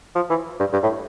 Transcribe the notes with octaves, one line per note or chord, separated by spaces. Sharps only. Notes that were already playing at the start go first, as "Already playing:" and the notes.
F3
E3
G2
G2
A2